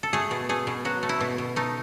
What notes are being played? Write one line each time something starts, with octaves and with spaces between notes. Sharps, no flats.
A4
A3 G#4
B2
A3 G#4
B2
F#3 F#4
A3
E4
B2
B2
A3 D#4